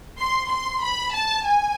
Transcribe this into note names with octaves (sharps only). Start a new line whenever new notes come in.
C6
C6
B5
A5
G#5